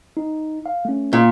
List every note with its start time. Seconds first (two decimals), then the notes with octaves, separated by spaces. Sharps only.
0.17 D#4
0.66 F5
0.85 A3 C#4
1.13 A#2